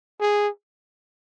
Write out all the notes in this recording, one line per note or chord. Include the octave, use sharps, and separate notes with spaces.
G#4